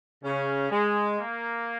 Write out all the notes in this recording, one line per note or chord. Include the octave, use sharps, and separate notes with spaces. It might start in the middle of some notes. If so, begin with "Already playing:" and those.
C#3 C#4
G#3
A#3